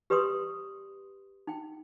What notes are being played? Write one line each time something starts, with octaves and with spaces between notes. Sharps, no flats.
G4 B4 D5 C6 D#6
D#4 G5